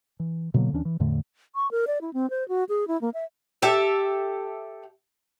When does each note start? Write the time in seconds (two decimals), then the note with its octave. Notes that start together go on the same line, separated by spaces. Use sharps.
0.20 E3
0.54 B2 D3 F#3 A#3
0.73 D#2 E3 C#4 D4
0.85 E3
1.00 E2 A2 D3 A3
1.55 C#6
1.71 A#4
1.87 D5
2.01 E4
2.13 C4
2.30 C5
2.48 F#4
2.69 G#4
2.88 E4
3.01 A#3
3.14 E5
3.62 G4 A4 E5